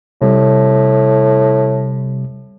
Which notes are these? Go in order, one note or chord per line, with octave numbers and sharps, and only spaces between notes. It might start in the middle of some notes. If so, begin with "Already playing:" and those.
A2 C3 G3